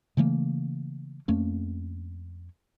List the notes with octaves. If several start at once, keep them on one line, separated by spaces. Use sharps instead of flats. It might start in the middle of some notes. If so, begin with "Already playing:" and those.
C#3 E3 A3 A#3
F2 A3 A#3 C#4